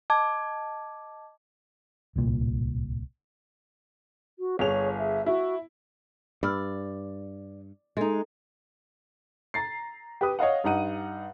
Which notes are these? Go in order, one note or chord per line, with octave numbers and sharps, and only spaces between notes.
D#5 A5 D6 G#6
D1 C2 A#2
F#4
G1 G#4 C#5 F7
E5
E4 F#4
G2 D5 B5 E6 F6
G#3 D#4 A4
A#5 A6 C7
G4 B4 D#6
C#5 D#5 F5 F#5
G2 D#4 F#5 D#7